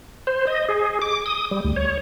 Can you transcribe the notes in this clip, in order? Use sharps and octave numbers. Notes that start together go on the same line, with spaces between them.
C5
D#5
G#4
D6
D#6
G3
D2
C#5